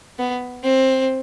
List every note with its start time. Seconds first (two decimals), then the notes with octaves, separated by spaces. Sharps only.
0.19 B3
0.64 C4